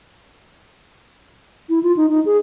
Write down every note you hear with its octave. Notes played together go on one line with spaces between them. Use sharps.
E4
F4
D#4
D#4
G#4